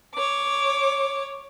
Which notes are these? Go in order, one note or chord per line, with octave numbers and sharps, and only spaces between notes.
C#5 D6